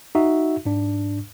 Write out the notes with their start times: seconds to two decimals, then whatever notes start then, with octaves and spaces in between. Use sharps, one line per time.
0.15 D#4 F#4 E5
0.65 G#2 D4